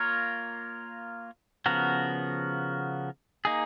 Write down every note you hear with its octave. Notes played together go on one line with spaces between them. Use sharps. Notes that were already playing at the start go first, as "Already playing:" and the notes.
Already playing: A#3 F4 A#4 C#5
C#3 F3 B3 F#4 A#4
A#3 D#4 G#4